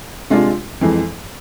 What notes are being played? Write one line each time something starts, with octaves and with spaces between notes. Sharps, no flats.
C3 G#3 D4 F4
F2 E3 G#3